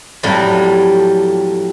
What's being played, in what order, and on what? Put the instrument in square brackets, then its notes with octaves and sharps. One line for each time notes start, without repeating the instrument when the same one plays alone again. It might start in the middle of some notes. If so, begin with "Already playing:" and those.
[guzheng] F2 A2 F#3 G3